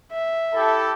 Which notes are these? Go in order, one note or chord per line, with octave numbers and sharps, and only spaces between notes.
E5
E4 G4 A4